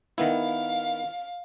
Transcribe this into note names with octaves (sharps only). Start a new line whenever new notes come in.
D#3 B3 E4 F5